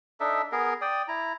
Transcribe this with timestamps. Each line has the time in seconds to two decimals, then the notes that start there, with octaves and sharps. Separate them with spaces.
0.20 D4 D#4 A4 E5
0.52 B3 G#4 A#4
0.81 D5 G5 D#6
1.08 E4 A#5